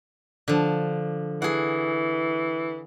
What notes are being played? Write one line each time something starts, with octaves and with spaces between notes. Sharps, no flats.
D3 F3
E3 G#4 F#5